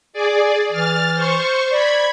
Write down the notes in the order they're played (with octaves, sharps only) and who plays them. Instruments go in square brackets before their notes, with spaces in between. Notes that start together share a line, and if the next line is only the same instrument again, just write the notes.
[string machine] G#4 D5
[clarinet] E3 [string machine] F6 A6
[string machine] C5 C#6
[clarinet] D5 [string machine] B5 G#6